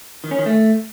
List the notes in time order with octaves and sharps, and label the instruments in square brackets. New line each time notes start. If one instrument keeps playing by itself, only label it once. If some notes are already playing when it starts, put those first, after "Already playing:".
[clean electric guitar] D#3
C#4
D#3
A3